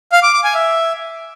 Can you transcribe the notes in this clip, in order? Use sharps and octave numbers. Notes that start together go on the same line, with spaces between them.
F5
D6
D6
G#5
E5